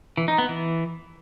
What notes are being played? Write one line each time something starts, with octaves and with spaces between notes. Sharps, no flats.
E3
D#4
B3
E3